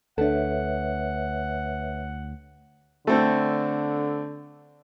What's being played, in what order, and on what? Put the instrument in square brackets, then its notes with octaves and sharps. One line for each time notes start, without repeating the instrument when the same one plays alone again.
[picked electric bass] D2 [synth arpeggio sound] D4 A4 [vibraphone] B4 C#5 E5 [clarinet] F#5
[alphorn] D3 [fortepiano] A3 C4 A4